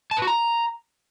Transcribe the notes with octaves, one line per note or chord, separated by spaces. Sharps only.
A5
B4
F#4
A#5